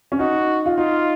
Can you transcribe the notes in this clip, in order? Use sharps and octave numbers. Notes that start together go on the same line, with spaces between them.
C#4
D#4 F#4
F4
D#4 F4